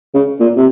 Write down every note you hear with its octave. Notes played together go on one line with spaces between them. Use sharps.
C#3
A#2
C3